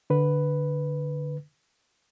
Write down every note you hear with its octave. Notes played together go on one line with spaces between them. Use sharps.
D3 B4